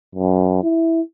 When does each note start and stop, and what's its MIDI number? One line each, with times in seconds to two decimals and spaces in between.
0.15 0.59 42
0.63 1.01 64